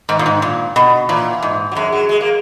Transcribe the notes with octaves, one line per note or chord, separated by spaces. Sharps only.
G#2 D#3
A#2
G#2
A#2
B2
A#2 E3
G#2
F#3
F#2 G#3
F#3
G#3
A#3